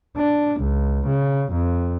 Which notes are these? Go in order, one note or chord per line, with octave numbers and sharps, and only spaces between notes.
D4
C#2
C#3
F2